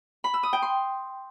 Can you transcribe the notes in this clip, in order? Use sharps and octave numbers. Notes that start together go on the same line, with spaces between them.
B5
E6
D#6
G5
C6